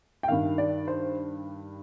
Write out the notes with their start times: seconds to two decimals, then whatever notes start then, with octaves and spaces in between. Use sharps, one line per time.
0.23 G5
0.28 G2 D#3 F5
0.58 D5
0.88 C5